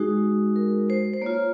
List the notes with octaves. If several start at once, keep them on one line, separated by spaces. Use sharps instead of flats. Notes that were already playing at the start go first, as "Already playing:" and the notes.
Already playing: G#3 D#4 F#4 G#4
A#4
C5
C5
A#3 F4 C#5